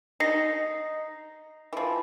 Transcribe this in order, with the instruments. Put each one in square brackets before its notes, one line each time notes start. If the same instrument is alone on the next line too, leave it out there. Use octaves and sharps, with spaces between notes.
[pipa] D#4 [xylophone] A#6 C7 C#7
[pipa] E3 F3